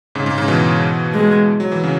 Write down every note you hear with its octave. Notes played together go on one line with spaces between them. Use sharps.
G#2 C#3
G#2 C#3
G#2 C#3
B2 E3
G#3
F#3
E3
C#3 F#3